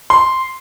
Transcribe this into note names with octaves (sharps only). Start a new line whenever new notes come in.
C6